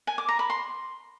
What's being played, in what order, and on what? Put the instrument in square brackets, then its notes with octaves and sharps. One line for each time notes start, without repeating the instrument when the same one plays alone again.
[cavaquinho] G#5
D6
A#5
B5
C6